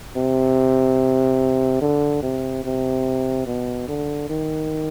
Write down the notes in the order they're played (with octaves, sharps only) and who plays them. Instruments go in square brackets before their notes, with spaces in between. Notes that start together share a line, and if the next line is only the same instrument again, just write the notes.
[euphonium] C3
D3
C3
C3
B2
D3
D#3